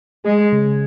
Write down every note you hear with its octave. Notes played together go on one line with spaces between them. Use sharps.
G#3 G#4
C#3